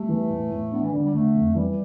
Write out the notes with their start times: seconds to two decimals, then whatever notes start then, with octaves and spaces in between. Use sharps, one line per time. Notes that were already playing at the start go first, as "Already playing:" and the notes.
Already playing: G3 A3
0.09 E3
0.29 A2
0.50 A2
0.72 B3 D4
0.82 E3
0.92 D3 G3
1.03 G3
1.14 D3 A3
1.34 F2
1.55 E3 G3